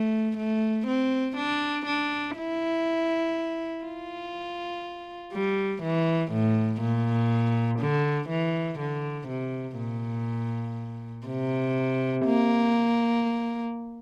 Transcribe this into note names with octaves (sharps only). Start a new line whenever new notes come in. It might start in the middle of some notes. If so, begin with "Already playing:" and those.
Already playing: A3
A3
C4
D4
D4
E4
F4
G3
E3
A2
A#2
D3
E3
D3
C3
A#2
C3
A#3